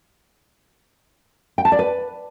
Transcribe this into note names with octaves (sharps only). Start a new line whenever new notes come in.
G5
A5
D5
B4